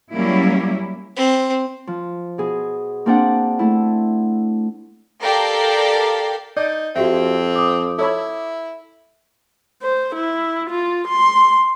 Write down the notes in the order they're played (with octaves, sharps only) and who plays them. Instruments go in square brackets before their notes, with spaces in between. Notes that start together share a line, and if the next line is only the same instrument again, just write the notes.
[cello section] F#3 G3 A#3 C#4 E4
[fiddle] C4
[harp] F3
B2 G#4
A#3 C4 D4 C5 D5 F#5
A3 E4
[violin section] G4 A4 A#4 D5 F5 G5
[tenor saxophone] D#4 [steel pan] D5 [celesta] G6
[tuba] F2 [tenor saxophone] C4 [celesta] F#4 G4 E5
[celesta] D6 D#6
[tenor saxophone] E4 [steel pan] A4 C#5 B5
[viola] C5
E4
F4
C6